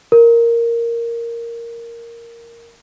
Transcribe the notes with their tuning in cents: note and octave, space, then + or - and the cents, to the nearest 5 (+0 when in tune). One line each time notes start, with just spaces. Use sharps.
A#4 -5